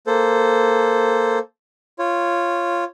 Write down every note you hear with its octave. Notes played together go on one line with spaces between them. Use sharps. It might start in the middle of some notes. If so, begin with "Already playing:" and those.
A#3 A4 C5
F4 C#5